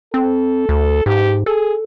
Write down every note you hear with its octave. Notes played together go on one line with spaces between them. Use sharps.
C4 A4
D2
G#2 G4
G#4 A4